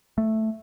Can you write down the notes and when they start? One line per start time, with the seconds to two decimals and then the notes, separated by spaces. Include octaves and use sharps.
0.18 A3